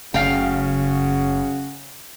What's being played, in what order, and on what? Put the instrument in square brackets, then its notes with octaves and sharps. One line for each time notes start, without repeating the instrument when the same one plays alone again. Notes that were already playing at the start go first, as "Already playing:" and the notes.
[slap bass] F#1 A3 [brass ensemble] C#3 F#4 [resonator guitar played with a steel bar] F5 G5